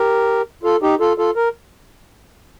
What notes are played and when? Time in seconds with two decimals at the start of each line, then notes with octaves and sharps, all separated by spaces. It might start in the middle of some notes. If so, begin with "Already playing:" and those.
Already playing: G4 A#4
0.63 F4 A4
0.82 D#4 G4
1.00 F4 A4
1.18 F4 A4
1.36 A#4